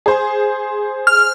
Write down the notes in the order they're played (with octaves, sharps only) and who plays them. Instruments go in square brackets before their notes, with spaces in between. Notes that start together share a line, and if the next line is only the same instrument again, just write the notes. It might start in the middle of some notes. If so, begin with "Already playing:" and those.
[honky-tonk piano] G#4 C5
[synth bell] F6